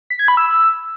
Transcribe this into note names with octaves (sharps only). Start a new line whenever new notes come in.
B6
G#6
B5
E6